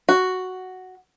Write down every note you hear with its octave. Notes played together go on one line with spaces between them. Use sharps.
F#4